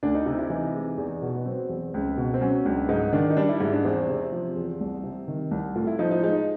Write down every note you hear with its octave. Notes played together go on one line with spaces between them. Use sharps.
D2 D4
D#4
C3 D#4
E4
E3 D#4
G#3
E2
B2
B3
F#3 C4
E2
C#2
B2
C4
F#3 C#4
C#2 D4
G#2 D#4
D#3 D4
D#4
G3 D4
E4
G#2 E4
D4
E2 C4
C3
F3
E2
C2
C3
D#3
C2
A2 F4
E4
F3 D#4
D#4
G#3 D#4